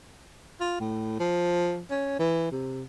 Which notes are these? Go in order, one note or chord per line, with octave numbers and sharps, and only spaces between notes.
F4
A2
F3
C#4
E3
C3